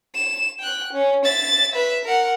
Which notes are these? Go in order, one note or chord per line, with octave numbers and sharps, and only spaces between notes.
E7
G5 F#6
C#4
E5 A6
B4 E5
A#4 F#5